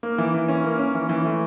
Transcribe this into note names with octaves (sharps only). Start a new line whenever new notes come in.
A#3
E3
E3
C#4
A#3
C#4
E3
E3
A3